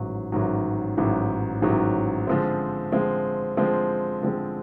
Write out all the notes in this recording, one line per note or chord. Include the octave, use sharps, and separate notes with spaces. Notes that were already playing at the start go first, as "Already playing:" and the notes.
Already playing: A1 G#2 D#3 F#3
A1 G#2 D#3 F#3
A1 G#2 D#3 F#3
A1 G#2 D#3 F#3
D3 F3 G#3 C4
D3 F3 G#3 C4
D3 F3 G#3 C4
D3 F3 G#3 C4